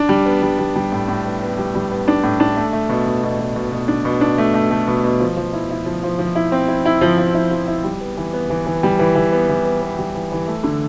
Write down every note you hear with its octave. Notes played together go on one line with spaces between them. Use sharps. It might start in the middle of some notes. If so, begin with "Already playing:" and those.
Already playing: D4
G3
B3
G3
G3
G3
A2
A2
B3
B3
G3
G3
B3
D4
A2
D4
A3
A3
B2
B2
B2
B2
B2
B2
D4
B2
D4
A3
A3
A3
B2
B2
F3
F3
E4
E4
F3
F3
F3
E4
C4
E4
E4
F3
F3
E4
F3
E4
G3
B3
E3
B3
E3
E3
G3
E3
E3
B3
E3
B3
B3
G3
E3
E3
A3
D3